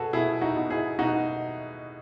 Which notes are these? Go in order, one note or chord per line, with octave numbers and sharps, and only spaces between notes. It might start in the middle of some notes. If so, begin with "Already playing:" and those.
Already playing: B2 F#4 G#4 A4 B4
B2 E4 G#4
D#4 F#4
B2
E4 G#4
B2 D#4 F#4